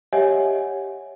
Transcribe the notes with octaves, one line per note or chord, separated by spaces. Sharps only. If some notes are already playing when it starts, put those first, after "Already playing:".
G4 C#5 D#5 E5 F#5 G#5